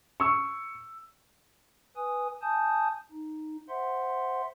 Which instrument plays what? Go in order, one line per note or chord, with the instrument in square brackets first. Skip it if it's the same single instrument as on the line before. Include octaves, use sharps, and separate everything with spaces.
[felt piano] C#6 E6
[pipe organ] B4 G#5 D#6
G#5 A5 D#6 G6
D#4
C5 E5 F#5 C6